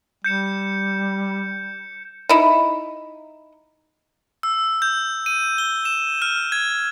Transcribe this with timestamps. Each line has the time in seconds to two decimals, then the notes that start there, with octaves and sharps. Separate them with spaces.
0.24 G3 G6 C#7 E7
2.29 D#4 E4
4.43 E6
4.82 G6
5.26 D#7
5.58 G7
5.85 E7
6.22 F6
6.52 G#6